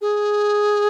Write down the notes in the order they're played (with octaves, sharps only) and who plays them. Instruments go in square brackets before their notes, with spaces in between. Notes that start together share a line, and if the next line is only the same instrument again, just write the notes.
[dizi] G#4